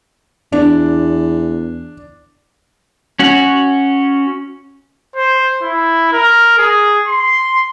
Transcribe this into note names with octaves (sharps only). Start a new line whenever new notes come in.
E2 D4
C#4 F#4
C5
E4
A#4
G#4
C6